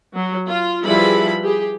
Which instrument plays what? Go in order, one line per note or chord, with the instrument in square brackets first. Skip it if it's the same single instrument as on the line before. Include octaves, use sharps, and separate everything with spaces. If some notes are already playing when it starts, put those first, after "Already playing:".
[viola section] F#3
F4
F3 G3 E4 G#4 B4 B5
G4 G#4